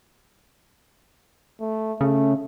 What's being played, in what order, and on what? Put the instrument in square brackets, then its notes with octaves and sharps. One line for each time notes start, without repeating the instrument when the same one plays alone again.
[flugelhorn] A3
[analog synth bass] C#3 [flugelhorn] A3